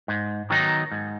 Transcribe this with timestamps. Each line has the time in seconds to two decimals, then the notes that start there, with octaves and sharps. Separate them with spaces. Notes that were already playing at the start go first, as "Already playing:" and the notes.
0.08 G#2
0.50 D#3 F#3 B3 D#4
0.92 G#2